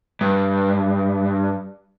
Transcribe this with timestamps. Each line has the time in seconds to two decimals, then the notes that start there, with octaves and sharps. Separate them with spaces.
0.21 G2